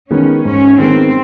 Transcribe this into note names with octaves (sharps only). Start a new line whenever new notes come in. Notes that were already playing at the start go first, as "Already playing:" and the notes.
D#3 G#3 B3 C#4
G#2 C#4
D#3 G#3 B3 C4